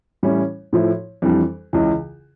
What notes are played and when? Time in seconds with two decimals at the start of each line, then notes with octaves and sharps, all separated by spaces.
0.23 A2 E3 G3 C#4 E4
0.73 A2 F3 A3 E4
1.22 F2 E3 G3 D4
1.73 C#2 C#3 E3